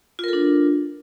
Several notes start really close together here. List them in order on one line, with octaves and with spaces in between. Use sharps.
F4 A#4 A4 D4